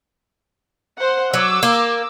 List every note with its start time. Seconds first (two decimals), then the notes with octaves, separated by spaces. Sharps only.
0.97 C5 F#5
1.34 F#3 D6 E6
1.63 A#3